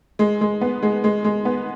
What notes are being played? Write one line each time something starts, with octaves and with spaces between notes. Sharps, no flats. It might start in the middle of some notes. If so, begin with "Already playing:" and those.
G#3
G#3
B3
G#3
G#3
G#3
B3